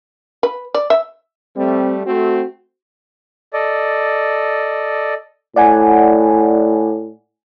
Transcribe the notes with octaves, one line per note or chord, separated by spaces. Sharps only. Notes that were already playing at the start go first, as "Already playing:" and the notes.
B4
D5
E5
G3 A3 C4
A3 C4 F#4
A4 D5 D#5
A2 D5 F#5 G#5